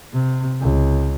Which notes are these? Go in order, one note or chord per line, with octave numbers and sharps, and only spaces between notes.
C3
C#2